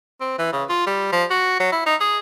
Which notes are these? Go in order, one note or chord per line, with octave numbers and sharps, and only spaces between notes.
C4
E3
C#3
F4
G3
F3
F#4
F#3
E4
D#4
G#4